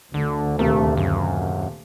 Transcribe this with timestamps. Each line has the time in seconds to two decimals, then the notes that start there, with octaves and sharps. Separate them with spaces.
0.14 D2 D3
0.59 D#1 C3 A3 A#4
0.97 F#2